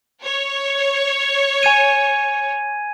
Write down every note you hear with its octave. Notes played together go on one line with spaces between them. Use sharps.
C#5
G#5 G#6 D#7